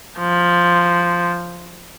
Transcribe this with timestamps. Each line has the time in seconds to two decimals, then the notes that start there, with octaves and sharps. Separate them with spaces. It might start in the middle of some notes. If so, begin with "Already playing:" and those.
0.19 F3